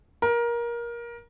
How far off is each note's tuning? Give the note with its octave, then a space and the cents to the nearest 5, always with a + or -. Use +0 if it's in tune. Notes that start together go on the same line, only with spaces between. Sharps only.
A#4 +20